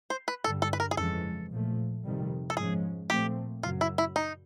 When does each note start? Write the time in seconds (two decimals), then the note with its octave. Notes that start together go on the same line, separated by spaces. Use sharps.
0.10 C5
0.28 B4
0.44 G2 D3 G3 A4
0.62 A4
0.73 B4
0.80 A#4
0.91 G#4
0.97 F2 C#3 E3 G#3 C#4 A4
1.51 A#2 F3 A3
2.04 F2 C3 D#3 G3
2.50 A4
2.57 G#2 F3 G#3 C#4 G#4
3.10 A#2 F3 A3 C4 G4
3.63 F#2 C#3 F#3 F4
3.81 E4
3.98 E4
4.16 D#4